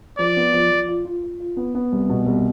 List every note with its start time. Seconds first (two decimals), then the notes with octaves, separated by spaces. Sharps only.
0.19 F3 D5
0.37 B3
0.53 F3
0.71 F3
0.88 F4
1.05 F4
1.23 F4
1.40 F4
1.57 B3
1.75 B3
1.92 C2
2.09 B2
2.26 C2